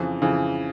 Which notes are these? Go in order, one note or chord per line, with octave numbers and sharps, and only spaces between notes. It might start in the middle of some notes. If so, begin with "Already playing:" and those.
Already playing: F2 C#3 E3
F2 C#3 E3